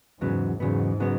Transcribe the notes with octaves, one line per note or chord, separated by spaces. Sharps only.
E2 G#2 C#3 F#3 B3
E2 G#2 C#3 F#3 B3
C#3 F#3 B3